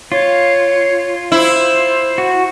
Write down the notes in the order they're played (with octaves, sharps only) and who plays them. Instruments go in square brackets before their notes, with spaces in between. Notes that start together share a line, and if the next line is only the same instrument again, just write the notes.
[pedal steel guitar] F4 [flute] C#5
[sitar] E4 [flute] C5
[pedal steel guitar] F#4